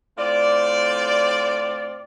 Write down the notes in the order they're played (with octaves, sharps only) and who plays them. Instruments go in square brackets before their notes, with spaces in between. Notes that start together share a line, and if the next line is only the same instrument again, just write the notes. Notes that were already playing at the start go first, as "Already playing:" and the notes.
[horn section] A2 C4 F4 D5